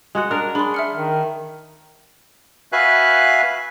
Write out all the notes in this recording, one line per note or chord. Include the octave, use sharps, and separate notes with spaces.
G#3 F#4 F#5
D4 A#4
D4 G#4 B5 C6
E5 F6 C#7
D#3
F#4 B4 E5 F5 G#5 F#6